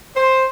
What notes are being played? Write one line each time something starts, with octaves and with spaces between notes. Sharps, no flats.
C5